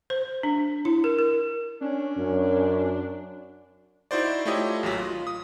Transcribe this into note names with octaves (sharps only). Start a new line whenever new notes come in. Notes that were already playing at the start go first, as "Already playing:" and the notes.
C5
D4
E4
A#4
A#4
C#4 D4
F#2
D#4 E4 F#4 C5 D5
A3 E4 F4 G4 C#5 D#5
A1 D#2 F#3
F4
D#6